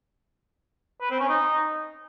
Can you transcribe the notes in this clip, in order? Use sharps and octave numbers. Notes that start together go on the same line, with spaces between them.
B4
C4
C#4
D#4